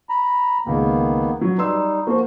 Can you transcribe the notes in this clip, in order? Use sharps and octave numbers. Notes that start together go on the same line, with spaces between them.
A#5 B5
C#2 D#3 A#3 B3
F#3
G3 D#4 B4 C6 E6
F3 A#3 F#4 C5